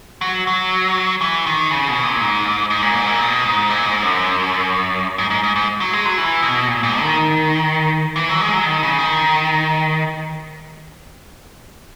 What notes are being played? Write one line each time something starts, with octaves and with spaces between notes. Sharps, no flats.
F#3
F#3
E3
D#3
C#3
B2
A#2
G#2
G#2
A#2
G#2
A#2
B2
G#2
A#2
G#2
F#2
G#2
G#2
G#2
G#2
F#3
G#3
F#3
E3
B2
A#2
G#2
D#3
E3
F#3
G#3
F#3
D#3
C#3
D#3